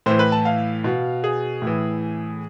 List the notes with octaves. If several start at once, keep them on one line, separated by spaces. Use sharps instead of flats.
A2 E3 C5
B4
A5
F5
B2
G#4
A2 E3